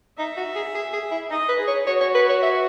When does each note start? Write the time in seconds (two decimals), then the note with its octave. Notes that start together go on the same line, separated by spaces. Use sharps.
0.18 D#4 E5
0.37 F#4
0.55 G#4
0.75 G#4
0.93 G#4
1.11 E4
1.30 D#4 D#5
1.49 B4
1.59 G#4
1.67 C#5
1.87 F#4 C#5
2.01 C#5
2.15 B4
2.29 C#5
2.42 E5